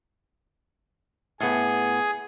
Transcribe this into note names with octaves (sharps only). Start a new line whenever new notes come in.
A2 B3 G#4